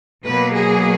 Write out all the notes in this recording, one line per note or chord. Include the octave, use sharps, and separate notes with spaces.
B2 F#3 A#3 B4
G#4